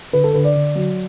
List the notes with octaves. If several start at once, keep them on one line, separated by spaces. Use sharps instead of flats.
D3 B4
A4
D3 B4
D5
D3
F#3